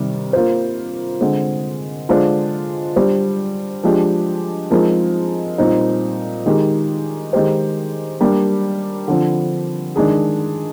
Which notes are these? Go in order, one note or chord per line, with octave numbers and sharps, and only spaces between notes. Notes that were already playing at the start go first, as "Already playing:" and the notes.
Already playing: C3 D#3 G3
A#3 F4 C5
D3 G#3 C4
D3 G#3 D4 F4 C5
G3 D4 G4 C5
F3 G#3 D4 G4
F3 G#3 C4 D#4 A#4
A#2 G3 C4 D#4
D#3 G#3 D#4 G4
D#3 G#3 D#4 G4 C5
G3 A#3 D4 G4
D3 F3 C4
D#3 G#3 D4 G#4